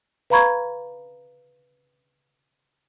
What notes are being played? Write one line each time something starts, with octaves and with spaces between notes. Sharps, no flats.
B4 F5 A#5 B5 C#6 G#6